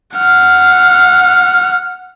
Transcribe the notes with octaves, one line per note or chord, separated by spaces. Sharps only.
F#5 F6